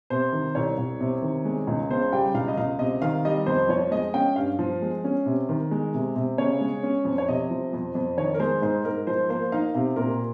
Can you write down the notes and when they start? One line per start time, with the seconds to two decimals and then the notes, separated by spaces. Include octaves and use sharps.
0.10 C3 C5
0.33 D#3
0.55 C2 C#5
0.78 C2
1.01 C3
1.22 D#3
1.45 G#3
1.67 C#2
1.91 C#3 C5
2.12 G3 G5
2.34 C#2 F5
2.48 D#5
2.57 C#2 F5
2.79 C3 D#5
3.02 D#3 F5
3.25 G3 D#5
3.46 F2 C5
3.69 F3 C#5
3.91 G#3 D#5
4.14 C#4 G5
4.36 G2 F5
4.59 F3
4.82 G#3
5.04 C#4
5.26 C3
5.49 D#3
5.71 G#3
5.94 C3
6.16 C3
6.38 C#3 C#5
6.61 G#3
6.83 C#4
7.05 F2
7.18 C#5
7.29 C3 D#5
7.50 F3
7.73 F2
7.95 F2
8.17 D#3 C#5
8.34 A#4
8.39 G#3 C5
8.62 G#2 C5
8.85 G#2 A#4
9.07 F3 C5
9.29 A#3 C5
9.52 D#4 F5
9.75 C3 F5
9.96 A#2 A#4